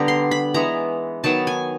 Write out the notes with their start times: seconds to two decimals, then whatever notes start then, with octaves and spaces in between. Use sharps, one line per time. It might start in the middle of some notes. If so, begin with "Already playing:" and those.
Already playing: D3 G3 B3 A#5
0.08 C6
0.31 B5
0.54 E3 G#3 B3 A#5
1.24 D#3 F#3 B3 A5
1.47 G#5